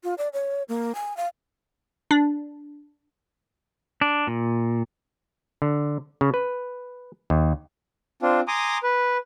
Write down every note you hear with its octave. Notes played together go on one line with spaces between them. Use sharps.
F4
D5
C#5
A#3
G#5
F5
D4
D4
A#2
D3
C#3
B4
D#2
C4 D4 F4
G#5 A#5 C6 D6 D#6
B4